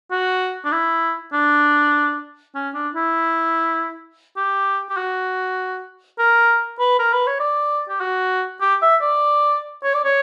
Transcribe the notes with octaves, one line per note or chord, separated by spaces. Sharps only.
F#4
D4
E4
D4
C#4
D4
E4
G4
G4
F#4
A#4
B4
A#4
B4
C#5
D5
G4
F#4
G4
E5
D5
C#5
D5
C#5